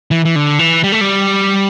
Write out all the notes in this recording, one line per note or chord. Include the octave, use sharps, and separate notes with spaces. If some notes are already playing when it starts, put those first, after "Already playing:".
E3
E3
D3
E3
G3
A3
G3